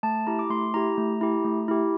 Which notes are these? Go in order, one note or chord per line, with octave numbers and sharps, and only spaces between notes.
A3 A5
E4 G4 A#5
D6
A3 C6
E4 G4 A#5
A3
E4 G4
A3
E4 G4